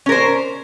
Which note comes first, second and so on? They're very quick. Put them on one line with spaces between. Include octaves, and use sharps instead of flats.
C#4 A#4 C5